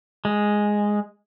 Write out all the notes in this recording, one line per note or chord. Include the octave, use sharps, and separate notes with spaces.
G#3